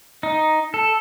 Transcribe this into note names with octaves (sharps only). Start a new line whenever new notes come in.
D#4
A4